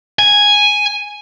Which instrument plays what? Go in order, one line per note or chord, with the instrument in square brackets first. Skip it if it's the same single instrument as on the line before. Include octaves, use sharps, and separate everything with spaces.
[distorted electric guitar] G#5